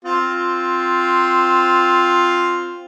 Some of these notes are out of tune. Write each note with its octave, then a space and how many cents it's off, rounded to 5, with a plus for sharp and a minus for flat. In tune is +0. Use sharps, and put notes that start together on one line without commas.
C4 +0 F4 +5